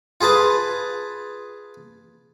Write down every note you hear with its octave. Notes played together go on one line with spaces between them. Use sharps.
F4 G#4 B4 A5